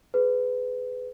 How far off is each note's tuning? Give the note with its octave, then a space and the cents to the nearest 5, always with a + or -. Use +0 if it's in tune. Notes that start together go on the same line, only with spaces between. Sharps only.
G#4 +20 B4 +25